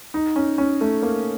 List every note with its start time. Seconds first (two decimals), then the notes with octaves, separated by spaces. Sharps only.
0.14 D#4
0.36 C#4
0.58 C#4
0.81 A3
1.02 A#3